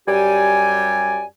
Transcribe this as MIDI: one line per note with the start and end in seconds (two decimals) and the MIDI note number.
0.08 1.23 42
0.08 1.23 55
0.08 1.23 67
0.08 1.23 74
0.08 1.23 80